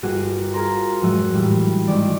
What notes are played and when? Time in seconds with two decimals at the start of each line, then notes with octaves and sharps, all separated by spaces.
0.03 G1 A#3 F#4 G#4 F#5 D#7
0.53 F4 G#4 A#4 C5 A#5 C6
1.02 F1 G#2 F#3 E5 F#5 D#7
1.34 A2 E3 F#3 G3
1.87 G#1 D#3 G#3 D5 A6